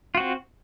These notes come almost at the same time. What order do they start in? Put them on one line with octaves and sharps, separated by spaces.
F4 F#4 C4